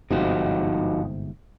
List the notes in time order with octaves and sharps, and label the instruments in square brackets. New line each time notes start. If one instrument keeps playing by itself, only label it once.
[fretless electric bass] G1 G#2 C3 [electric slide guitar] F3 D#4 F#4